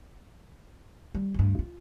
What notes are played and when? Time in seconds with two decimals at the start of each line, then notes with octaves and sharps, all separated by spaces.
1.15 G3
1.34 D2 G2
1.59 F4